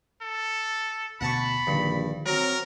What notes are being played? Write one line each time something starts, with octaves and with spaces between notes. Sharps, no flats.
A4
D2 B2 F#5 A5 B5 C#6
A#1 G2 D3 D#3
F#3 C4 A#4